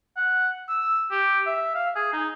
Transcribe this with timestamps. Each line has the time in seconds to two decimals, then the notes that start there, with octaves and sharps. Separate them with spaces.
0.17 F#5
0.69 E6
1.11 G4
1.46 E5
1.75 F5
1.95 G#4
2.13 D#4